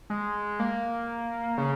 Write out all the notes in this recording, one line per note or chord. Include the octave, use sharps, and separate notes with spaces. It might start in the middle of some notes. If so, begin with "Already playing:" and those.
G#3
A#3
C#3